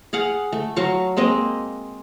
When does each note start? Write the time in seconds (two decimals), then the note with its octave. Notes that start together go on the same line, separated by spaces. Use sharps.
0.13 G#4 F5 F#5
0.52 A3
0.76 F#3 F5 C#6
1.17 G#3 A#3 C4 D#5